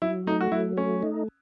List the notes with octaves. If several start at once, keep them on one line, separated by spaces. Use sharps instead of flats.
F#3 E4
A3 D#4
F#4
F#3 E4
A3 C#4
D#4